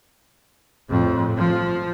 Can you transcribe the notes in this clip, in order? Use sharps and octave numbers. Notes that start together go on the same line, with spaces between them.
F2 A2
F3